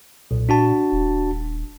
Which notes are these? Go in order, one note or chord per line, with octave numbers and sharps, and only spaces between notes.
B1 A#2
D4 F#4 A5
D#1